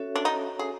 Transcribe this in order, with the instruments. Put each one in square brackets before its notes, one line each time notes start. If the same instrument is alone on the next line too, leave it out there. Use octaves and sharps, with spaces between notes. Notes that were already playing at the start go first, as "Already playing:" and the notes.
Already playing: [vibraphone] C#4 F#4 A4 C#5 E5
[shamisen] D4
D#4
G#4